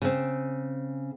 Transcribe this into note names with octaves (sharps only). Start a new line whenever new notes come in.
C#3 C4